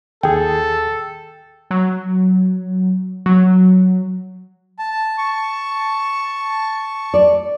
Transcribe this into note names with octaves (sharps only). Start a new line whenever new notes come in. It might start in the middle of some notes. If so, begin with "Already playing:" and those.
D#2 G#4 A4 G5
F#3
F#3
A5
A5 C#6
D5